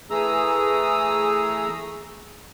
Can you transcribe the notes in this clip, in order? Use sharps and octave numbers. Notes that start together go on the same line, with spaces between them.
E3 A3 G#4 A#5 D#6 E6